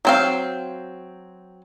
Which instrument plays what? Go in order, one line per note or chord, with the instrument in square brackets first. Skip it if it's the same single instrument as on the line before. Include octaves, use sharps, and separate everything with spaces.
[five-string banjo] F#3 C4 F5